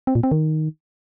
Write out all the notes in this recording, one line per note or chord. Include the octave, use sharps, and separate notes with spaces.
C4
A#2
C4
D#3